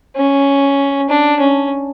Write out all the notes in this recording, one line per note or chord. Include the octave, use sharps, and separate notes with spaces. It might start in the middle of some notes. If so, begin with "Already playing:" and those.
C#4
D4
C#4